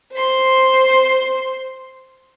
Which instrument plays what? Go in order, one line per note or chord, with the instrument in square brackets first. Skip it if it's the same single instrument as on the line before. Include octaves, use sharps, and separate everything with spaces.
[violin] C5 C6